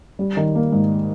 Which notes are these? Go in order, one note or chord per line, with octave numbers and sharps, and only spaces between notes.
G3
D#3
A#3
G#2